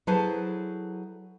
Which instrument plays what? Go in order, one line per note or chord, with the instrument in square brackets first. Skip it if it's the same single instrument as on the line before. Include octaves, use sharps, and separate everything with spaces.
[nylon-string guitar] F#3 E4 G#4 A4 B4 C5